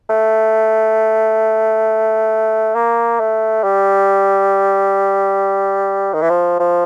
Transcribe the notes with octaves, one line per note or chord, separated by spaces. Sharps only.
A3
A#3
A3
G3
D#3
E3
F3
F3